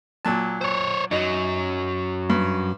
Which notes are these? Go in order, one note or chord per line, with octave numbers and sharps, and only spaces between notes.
A#2 F#3 A5
C5 C#5
F#2 F#3 D#4
G2